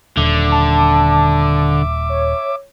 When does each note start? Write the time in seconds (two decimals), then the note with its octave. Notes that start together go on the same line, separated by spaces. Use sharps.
0.17 D#1 D3 E5 D6
0.52 A5
2.09 C#5